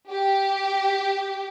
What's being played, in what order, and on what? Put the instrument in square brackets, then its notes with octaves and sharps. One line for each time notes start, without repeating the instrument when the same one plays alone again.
[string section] G4